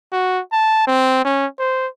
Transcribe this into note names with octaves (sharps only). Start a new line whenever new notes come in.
F#4
A5
C4
C#4
C5